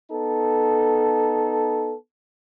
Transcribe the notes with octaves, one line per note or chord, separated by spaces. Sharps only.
B3 D#4 A4